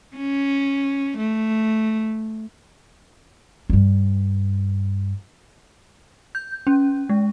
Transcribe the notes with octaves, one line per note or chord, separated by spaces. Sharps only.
C#4
A3
G2 G3
G6
C#4
G#3